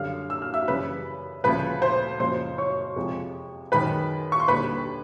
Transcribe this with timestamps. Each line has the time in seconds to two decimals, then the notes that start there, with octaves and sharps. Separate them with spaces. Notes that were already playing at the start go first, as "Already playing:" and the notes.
Already playing: F#2 D3 G3 F5 F6
0.30 E6
0.42 F6
0.54 E5 E6
0.68 F#2 C#3 E3 G3 B4 B5
1.44 D2 C#3 F3 B4 B5
1.82 C5 C6
2.20 F#1 F#2 C#3 F3 C5 C6
2.58 C#5 C#6
2.96 F2 C3 F3 G#3
3.72 F#2 D#3 G#3 B4 B5
4.32 C#6
4.40 C6
4.48 D#2 D3 G3 B4 B5